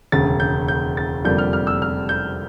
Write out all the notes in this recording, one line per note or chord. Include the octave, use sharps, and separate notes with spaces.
E1 D2 C#3 A6
G6
G6
A6
F1 F2 D3 G3 A#3 G6
F6
F6
E6
F6
G6